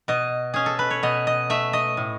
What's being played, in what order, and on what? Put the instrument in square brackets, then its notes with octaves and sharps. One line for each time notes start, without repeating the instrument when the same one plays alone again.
[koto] B2 D#5
C#4 G#4
A4
B4
C#5
B2 D#5
D#5
A3 E5
D#5
A2